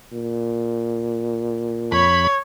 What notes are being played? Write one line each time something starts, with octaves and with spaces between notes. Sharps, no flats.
A#2
F2 C#5 B5